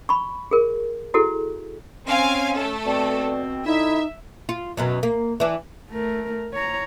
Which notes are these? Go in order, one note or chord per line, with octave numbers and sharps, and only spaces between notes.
B5 C#6
G#4 A#4
E4 F#4 G#4 A4
C4 C#4 F5 G#5
A3 A4
B2 C4 D5
D3 D#4 E4 E5
F4
F#2 B2 F#3
A#3
E3 D4
A3 A#4
C#5 A#5